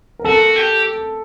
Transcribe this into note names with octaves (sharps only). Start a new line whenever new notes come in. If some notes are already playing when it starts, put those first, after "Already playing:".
A#4
F#4 A4
G4